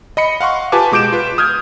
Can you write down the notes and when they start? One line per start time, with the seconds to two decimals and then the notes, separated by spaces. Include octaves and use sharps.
0.17 D#5 B5 C#7
0.41 F5 F#5 C6 C#6
0.72 F4 G4 B4 G#5 A5 D6
0.92 B2 G#3 D6 G6 D7 E7
1.12 F4 B4
1.38 D#6 F6 G6 G#6